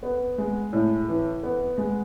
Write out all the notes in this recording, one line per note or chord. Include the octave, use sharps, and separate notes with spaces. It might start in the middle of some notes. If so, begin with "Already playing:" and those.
B3
G#3
A2
E3
B3
G#3